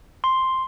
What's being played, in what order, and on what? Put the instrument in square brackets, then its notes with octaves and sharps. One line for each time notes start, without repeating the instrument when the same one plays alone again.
[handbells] C6